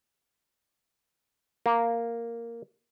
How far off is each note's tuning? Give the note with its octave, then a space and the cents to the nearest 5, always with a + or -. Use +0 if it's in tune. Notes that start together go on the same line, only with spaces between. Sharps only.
A#3 -5